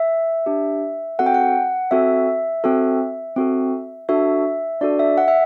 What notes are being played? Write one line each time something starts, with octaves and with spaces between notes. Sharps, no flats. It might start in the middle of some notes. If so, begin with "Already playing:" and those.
Already playing: E5
D4 G4
C4 F#4 A4 F#5
G5
F#5
C4 F#4 A4 E5
C4 F#4 A4
C4 F#4 A4
D4 F#4 A4 E5
D4 F#4 A4 D5
E5
F#5
E5